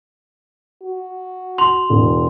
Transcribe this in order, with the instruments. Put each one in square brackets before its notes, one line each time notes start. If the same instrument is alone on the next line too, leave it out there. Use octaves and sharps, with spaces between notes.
[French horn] F#4
[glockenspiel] C6 [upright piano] F7
[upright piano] E1